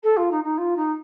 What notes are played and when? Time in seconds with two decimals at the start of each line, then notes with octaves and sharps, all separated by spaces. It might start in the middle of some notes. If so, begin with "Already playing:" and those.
0.03 A4
0.16 F4
0.31 D#4
0.44 D#4
0.58 F4
0.76 D#4